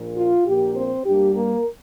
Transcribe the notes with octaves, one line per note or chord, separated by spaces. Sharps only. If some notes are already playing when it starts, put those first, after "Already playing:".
Already playing: A#1 A#2 A#3
F4
A#1 A#2 A#3 G4
C4 C5
G2 G3 A#3 D4 G4
A#3 A#4